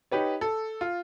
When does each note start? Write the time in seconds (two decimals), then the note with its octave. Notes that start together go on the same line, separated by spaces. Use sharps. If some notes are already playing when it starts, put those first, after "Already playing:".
0.11 D#4 G4 B4 C#5
0.41 A4
0.81 F4